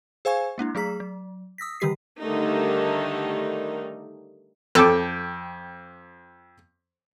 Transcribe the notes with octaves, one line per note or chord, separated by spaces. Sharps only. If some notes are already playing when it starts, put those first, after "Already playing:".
G#4 C5 F5 G#5 C#6 G#6
G#3 A#3 D4 E4
F#3 A3 G#4 A#5 B6
F#3
D#6 E6 A#6 B6
D3 D#3 G3 G4 B6 C7
D3 D#3 G3 A3 D#4
F2 A4 G5 D6